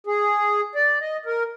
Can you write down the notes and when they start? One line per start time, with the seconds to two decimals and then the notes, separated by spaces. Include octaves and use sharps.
0.07 G#4
0.75 D5
1.01 D#5
1.26 A#4